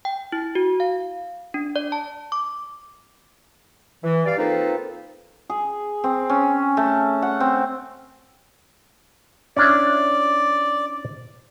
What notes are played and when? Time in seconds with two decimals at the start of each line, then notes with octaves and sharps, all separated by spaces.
0.05 G5
0.32 E4
0.55 F#4
0.80 F5
1.54 D4
1.76 D5
1.92 A5
2.32 D6
4.04 E3
4.26 G2 D5 F5
4.38 A#3 C4 D#4 F4 A4 B4
5.50 G#4
6.04 C4
6.30 C#4
6.77 A3
7.22 F#5
7.40 C4
9.57 C#4 D4 E4 D5